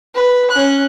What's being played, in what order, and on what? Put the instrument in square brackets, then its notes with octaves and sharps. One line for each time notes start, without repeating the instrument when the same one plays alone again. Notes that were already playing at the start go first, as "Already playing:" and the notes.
[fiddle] B4
C#4 F#6